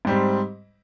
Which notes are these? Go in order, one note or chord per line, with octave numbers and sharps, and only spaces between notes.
G#2 G3 C4